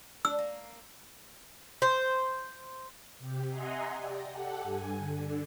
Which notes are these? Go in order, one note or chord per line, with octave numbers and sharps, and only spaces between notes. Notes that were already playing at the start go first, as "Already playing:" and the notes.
D4 E6
A#3
C5
C3 G4
D#5 E5 F#5 G#5 A#5 C6
G4 D5 A#6
G4 A4 F#5
G2 G#5
D3